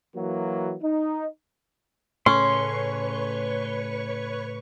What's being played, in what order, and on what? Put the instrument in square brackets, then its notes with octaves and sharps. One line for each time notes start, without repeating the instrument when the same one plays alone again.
[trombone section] E3 F#3 A#3 F#4
D#4
[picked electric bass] A2 C#3 A3 [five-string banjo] C#4 [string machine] B4 C#5 C#6 [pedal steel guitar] C6